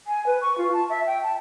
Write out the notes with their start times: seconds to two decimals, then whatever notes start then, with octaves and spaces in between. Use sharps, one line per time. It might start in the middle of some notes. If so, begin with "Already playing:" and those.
0.07 G#5
0.26 B4
0.42 C#6
0.58 F4
0.73 A5
0.90 E5
1.07 G5
1.23 A5